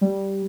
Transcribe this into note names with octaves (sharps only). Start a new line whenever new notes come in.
G3